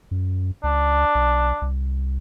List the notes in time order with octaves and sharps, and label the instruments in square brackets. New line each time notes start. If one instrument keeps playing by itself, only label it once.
[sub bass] F#2
[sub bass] C#2 [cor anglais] D4
[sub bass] B1
C2